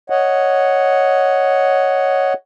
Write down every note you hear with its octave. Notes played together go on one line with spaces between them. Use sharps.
C#5 D#5 F#5